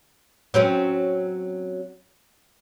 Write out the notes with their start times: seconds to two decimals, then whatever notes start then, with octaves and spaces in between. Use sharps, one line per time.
0.54 F#3 C4 C#4